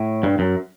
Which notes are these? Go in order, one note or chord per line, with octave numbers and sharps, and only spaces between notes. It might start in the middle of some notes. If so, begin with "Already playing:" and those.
Already playing: A2
G2
F#2